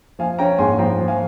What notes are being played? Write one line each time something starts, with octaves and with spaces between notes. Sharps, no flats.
F3 F5 G#5
C#4 G5 A#5
G#2 G#5 C6
F3 G5 A#5
F3
F5 G#5